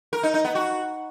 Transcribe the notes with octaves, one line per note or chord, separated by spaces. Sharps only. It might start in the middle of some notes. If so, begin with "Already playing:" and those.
A#4
D#4
D#4
B3
F#4